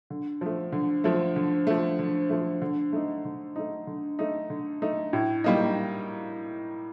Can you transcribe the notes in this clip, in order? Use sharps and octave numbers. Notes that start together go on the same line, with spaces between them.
D3
F3 A3
D3
F3 A3
D3
F3 A3
D3
F3 A3
D3
A3 D#4
D3
A3 D#4
D3
A3 D#4
D3
A3 D#4
A2
G3 A#3 D#4